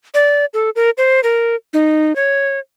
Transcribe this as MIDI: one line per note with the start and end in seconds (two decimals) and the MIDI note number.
0.14 0.45 74
0.54 0.70 69
0.76 0.90 70
0.98 1.20 72
1.23 1.56 70
1.73 2.15 63
2.16 2.59 73